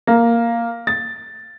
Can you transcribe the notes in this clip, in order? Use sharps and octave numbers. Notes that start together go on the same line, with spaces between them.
A#3
A6